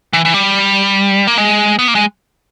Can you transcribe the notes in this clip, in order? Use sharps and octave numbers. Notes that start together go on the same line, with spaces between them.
E3
E3
G3
A#3
G#3
B3
A#3
G#3